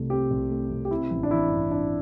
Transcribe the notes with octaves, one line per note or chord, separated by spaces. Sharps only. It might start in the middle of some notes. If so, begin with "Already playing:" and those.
Already playing: C2 C3 A3 C4
C4 G4
C2
A3
C3
G4
C4 E4
A1
D4
E3 E4
G2
C4 D4